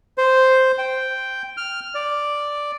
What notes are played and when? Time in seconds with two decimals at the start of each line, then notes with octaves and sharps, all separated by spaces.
0.18 C5
0.78 G5
1.57 F6
1.95 D5